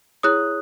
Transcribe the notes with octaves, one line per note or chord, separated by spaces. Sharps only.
E4 G#4 C#5 D#6 F#6